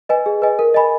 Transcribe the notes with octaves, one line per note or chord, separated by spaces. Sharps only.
B4 D#5 G#5
G#4
B4 D#5 G#5
A#4
D#5 G#5 B5